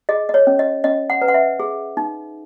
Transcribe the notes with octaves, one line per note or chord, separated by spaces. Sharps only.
G#4 D#5
D#5
C#5
C#4
D#5
C#4 D#5
F#5
B4
F#5
E5
G#4
D#4